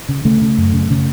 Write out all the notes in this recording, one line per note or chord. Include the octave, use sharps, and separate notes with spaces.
C#3
C#3 A3
C#3
F#2
C#3
C#3